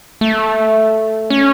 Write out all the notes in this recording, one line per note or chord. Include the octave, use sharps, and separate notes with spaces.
A3
C#4